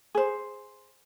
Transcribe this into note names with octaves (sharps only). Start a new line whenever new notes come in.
G#4 C5